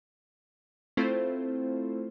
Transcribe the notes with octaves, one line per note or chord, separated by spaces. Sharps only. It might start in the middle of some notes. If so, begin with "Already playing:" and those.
A3 C4 E4 F4 A4 C5